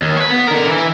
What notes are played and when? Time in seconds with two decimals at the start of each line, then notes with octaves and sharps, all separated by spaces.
0.02 D#2
0.17 B4 C#5
0.31 B3
0.48 D3 A#4
0.68 E3 E4